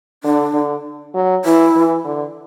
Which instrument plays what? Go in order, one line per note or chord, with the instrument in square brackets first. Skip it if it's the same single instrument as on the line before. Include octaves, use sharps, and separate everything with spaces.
[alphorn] D3 [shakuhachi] D4
[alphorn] D3
F#3
[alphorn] E3 [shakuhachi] E4
[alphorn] E3
D3